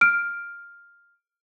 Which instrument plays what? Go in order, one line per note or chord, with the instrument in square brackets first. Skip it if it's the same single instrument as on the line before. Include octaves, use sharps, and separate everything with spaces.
[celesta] F6 D7